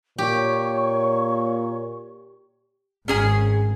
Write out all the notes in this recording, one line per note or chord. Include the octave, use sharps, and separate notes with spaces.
A#2 G4 C#5 C#6
G#1 C#4 G#4 G#5